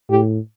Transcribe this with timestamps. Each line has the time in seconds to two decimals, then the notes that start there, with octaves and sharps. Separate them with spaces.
0.10 A2 G4